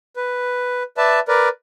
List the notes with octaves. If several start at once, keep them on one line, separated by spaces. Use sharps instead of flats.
B4
B4 D5 E5 A5
A#4 B4 D5